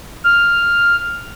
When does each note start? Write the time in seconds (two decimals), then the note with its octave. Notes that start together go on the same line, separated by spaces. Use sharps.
0.24 F6